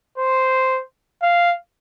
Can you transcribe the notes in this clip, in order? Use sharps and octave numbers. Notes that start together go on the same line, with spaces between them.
C5
F5